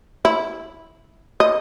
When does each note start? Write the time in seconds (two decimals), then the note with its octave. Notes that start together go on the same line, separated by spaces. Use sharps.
0.25 E4
1.40 D#5